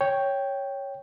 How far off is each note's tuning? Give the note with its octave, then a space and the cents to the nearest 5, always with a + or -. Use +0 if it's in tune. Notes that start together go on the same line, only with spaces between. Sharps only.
C#5 +0 G5 +0